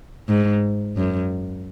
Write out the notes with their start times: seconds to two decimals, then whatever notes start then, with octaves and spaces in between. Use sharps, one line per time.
0.28 G#2
0.97 F#2